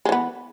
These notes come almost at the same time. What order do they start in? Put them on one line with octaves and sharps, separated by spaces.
G#3 E3 B3